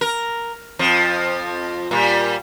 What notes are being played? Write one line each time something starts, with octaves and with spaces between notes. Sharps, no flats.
A#4
F2 F3
A#2 G3